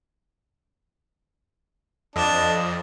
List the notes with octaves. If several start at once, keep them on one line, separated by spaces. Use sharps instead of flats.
F2 D4 D#5